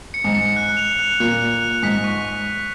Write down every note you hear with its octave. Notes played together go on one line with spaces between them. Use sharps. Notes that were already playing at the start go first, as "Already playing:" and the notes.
C#7
G#2
C#7
F#6
F7
F#6
A#2 F#6
F#6
F#6
G#2 B6
C#6